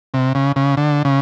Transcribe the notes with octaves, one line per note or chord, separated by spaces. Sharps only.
C3
C#3
C#3
D3
C#3